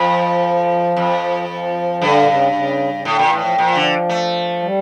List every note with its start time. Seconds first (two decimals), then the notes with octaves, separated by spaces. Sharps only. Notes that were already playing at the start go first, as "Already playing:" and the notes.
Already playing: F2 F3
0.97 F2
1.49 F3
2.01 G2 D3
2.21 A#2
2.28 C#3
2.53 C#3
2.94 C#3
3.05 A2 D3
3.19 A#2 E3
3.33 A2
3.40 F3
3.57 A#2 F3
3.75 D3
4.09 A3
4.62 G3